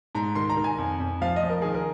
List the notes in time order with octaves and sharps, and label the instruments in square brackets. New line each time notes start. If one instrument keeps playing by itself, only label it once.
[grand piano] G#2 A#5
D#3 C6
A#5
D#3
G#5
F2
F2
F3 F5
D#5
F3
A#4
D#3 G#4
A#4